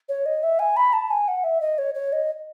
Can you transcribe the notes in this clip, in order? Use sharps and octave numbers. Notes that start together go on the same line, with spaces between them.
C#5
D#5
E5
G#5
B5
A5
G#5
F#5
E5
D#5
C#5
C#5
D#5